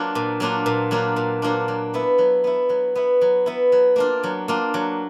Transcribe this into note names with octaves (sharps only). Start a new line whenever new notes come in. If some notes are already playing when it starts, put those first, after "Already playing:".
Already playing: F#3 A#3 D4 F4
A#2
F#3 A#3 D4 F4
A#2
F#3 A#3 D4 F4
A#2
F#3 A#3 D4 F4
F#3
B3 E4
F#3
B3 E4
F#3
B3 E4
F#3
B3 E4
F#3
A#3 D4 F4
F#3
A#3 D4 F4
F#3